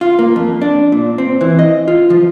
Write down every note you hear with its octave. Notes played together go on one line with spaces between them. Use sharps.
F4
A#3
F2
D4
A#2
C4
E3
D#5
F4
F3